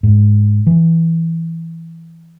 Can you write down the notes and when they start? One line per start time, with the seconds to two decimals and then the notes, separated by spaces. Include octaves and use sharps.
0.03 G#2
0.67 E3